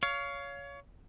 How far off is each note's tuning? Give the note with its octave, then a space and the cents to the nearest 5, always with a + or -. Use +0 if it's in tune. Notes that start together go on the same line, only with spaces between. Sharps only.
C#5 +25 F5 +0